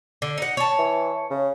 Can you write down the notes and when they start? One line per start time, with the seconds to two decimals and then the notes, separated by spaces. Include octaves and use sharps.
0.22 D3
0.38 D#4 F#5
0.57 C#5 A5
0.79 E3
1.30 C#3